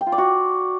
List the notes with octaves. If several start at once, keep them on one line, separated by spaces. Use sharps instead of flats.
G5
F4
D5
F#4